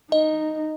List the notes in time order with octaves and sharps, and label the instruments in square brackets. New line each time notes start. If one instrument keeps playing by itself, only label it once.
[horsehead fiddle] D#4 [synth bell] D#5